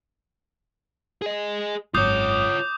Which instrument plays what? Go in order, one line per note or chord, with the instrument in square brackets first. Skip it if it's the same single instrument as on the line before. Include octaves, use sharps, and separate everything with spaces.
[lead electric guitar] G#4 D#5
[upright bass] G#1 F#2 [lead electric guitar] F4 C#5 [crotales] D6 D#6 G6